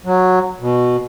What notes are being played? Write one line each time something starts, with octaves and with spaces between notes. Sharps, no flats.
F#3
B2